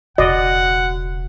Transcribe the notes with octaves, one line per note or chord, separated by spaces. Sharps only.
E1 C#3 F#4 D5 D#5 F#5